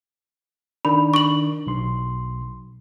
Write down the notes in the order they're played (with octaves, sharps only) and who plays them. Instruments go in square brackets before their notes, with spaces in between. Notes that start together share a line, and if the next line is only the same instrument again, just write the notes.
[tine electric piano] D#3 D4 [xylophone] B5
[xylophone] C#6 F#7
[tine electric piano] B1 C6